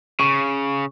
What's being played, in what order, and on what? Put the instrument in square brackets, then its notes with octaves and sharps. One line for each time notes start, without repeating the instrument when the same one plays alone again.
[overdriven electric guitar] C#3 [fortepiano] C#6